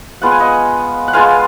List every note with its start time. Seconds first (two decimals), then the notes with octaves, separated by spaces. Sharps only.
0.22 G#3 B3 F4 F#5
0.32 G#5
0.40 D#5 F#5
1.08 F#5
1.13 G#3 B3 F4 F5 G#5